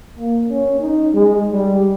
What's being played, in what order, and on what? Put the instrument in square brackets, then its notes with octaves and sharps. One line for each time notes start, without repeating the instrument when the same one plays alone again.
[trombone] A#3
C#4
D#4
G#3
G3